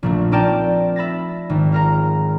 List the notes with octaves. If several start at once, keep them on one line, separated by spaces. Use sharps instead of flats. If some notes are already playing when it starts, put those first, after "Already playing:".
A#1 A#2 A3
C4 D#4 A#4 D5 G5 A5
E5 B5 A6 A#6
G#1
F4 A#4 A#5